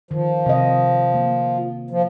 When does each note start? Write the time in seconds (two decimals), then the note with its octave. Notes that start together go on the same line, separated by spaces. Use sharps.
0.11 D#3 F3
0.46 C3 D#5
1.14 A#3
1.90 F3